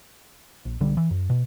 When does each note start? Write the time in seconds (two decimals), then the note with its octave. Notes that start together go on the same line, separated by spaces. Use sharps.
0.65 A#1
0.81 B1 D3 G3
0.97 E3
1.11 F#2
1.30 B2